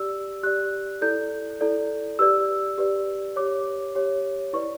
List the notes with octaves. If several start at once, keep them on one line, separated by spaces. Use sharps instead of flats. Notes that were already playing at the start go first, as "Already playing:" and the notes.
Already playing: G4 D5 E6
G4 D5 F#6
E4 A4 D5 G6
E4 A4 D5
G4 B4 D5 E6
G4 B4 D5
G4 C#5 D6
G4 C#5
E4 B4 D5 C#6